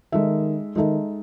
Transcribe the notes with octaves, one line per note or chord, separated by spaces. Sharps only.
D#3 G#3 D#4 A4 E5
D#3 G#3 D#4 A4 E5